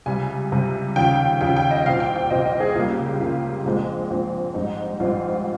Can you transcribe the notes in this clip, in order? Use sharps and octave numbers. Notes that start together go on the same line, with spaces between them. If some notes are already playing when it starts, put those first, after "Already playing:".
C#2 C3 G3 G#5
C#2 C3 G3
D#2 C#3 F3 G5
D#2 C#3 F3 G5
G5
D#5
C2 A#2 F3 C4 F5
G5
G5
C2 A#2 F3 C4 D#5
D#5
G#4
C#2 C#3 G3 A#3 F4
G4
G4
C#2 C#3 G3 A#3 F4
A#1 A#2 F3 G#3 C4
A#1 A#2 F3 G#3 C4
A#1 G#2 G3 C4 D#4
A#1 G#2 G3 C4 D#4 F4